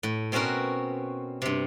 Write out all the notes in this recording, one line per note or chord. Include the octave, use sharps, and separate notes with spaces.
A2
B2 C4 C#4 F#4 A#4
G2 C3